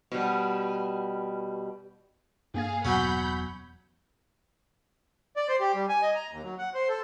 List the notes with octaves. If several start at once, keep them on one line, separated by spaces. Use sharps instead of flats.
B2 G3
G2 A#3 G#4 F5 G#6
E1 B2 F#3 C#4 F#5 B5 G6
D5
C5
G4
G3
G#5
D#5
A#5
D#2
F#3
F#5
C5
A4